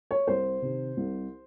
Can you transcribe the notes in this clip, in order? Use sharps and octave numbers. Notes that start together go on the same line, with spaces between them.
C#5
C2 C5
C3 D#3
C2